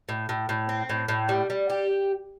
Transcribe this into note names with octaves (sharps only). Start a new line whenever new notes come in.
A2
A2
A2
C4
A2
A2
G3
G3
G4